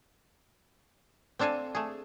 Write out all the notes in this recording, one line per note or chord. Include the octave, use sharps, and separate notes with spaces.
C4 D4 A4 F5 G#5
A3 G#4